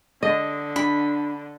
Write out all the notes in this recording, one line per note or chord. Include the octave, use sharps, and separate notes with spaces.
D3 D#5
D4 B5